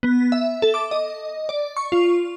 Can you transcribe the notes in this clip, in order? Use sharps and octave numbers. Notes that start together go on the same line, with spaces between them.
B3
E5
A4
D6
D#5
D5
C#6
F4